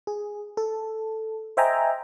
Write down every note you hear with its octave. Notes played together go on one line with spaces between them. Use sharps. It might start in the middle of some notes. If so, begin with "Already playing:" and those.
G#4
A4
C5 D#5 E5 G5 G#5 A#5